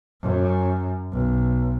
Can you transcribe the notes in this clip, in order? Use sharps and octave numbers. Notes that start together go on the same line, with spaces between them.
F#2
B1